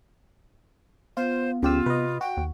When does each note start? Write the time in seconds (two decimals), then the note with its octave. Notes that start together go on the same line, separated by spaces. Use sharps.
1.17 B3 F4 C5
1.63 D2 C#3 F4 G4 E6
1.86 C3 B4 D#5
2.21 F#4 G5
2.37 D#2